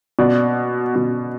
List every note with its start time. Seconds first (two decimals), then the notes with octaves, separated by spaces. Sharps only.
0.19 B2 D5
0.96 B2